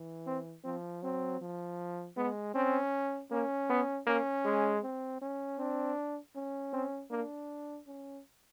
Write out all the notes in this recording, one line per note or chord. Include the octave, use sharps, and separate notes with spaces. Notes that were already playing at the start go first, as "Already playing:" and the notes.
Already playing: E3
C4
F3 C4
F#3 C4
F3
G#3 B3
C4 C#4
A#3 C#4
B3
A#3 C#4
G#3
C4
C#4
C4 D4
C#4
C4
A#3 D4
C#4